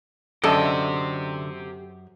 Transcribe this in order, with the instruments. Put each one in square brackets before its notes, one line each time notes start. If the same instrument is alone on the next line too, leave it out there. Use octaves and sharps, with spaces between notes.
[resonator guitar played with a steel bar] F#2 [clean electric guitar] D3 D5 D#5 [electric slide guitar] G4 C5 [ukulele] A4 A5